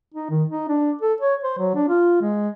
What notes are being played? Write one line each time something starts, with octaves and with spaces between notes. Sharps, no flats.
D#4
D#3
D#4
D4
A4
C#5
C5
F#3
D4
F4
G#3